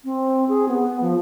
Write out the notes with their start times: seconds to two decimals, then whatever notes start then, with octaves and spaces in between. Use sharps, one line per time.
0.04 C4
0.49 G#4
0.68 B3
1.01 F3